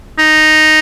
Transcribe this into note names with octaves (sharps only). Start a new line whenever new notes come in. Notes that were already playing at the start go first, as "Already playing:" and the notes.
D#4